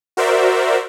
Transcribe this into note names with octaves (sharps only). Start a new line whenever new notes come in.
F#4 A#4 C5 D5 E5